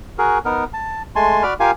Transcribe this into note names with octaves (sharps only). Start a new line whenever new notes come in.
F#4 G#4 A#4
B3 D#4 A#4
A5
G#3 A3 G#5 A5 C6
F#4 D5 B5 F6
F4 G4 A#4 F5 G#5